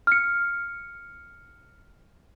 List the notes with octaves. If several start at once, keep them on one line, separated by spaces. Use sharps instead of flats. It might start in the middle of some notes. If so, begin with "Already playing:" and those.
F6 C#7